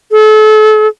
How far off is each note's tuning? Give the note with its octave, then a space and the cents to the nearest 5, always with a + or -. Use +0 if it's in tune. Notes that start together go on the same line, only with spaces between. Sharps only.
A4 -35